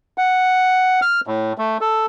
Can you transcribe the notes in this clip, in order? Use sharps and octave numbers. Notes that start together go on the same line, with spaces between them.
F#5
F6
A2
A3
A4